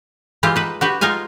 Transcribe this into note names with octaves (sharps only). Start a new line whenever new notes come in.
E3 G#3 F4 G4
D#4 B4
F#4 G4 B4
G#3 D#4 F4 F5 G#5